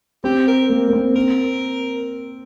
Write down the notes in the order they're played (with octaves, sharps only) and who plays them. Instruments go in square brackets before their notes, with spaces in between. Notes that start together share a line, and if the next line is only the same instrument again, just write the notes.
[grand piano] C4 [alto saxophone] G4
[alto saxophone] A#4
[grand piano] A#3
A#3
C4
[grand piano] C4 [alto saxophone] A#4